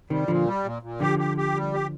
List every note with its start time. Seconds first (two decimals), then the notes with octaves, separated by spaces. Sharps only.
0.10 C3 D#3 G3
0.28 A#2 D3 F3
0.46 G3
0.64 A#2
0.82 A#2
1.00 D3 F3 G4
1.19 G4
1.37 G4
1.55 G3
1.73 G4